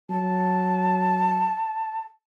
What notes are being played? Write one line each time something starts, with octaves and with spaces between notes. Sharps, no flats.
F#3 A5